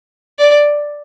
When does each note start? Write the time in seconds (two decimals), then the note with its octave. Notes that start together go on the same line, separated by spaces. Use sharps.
0.39 D5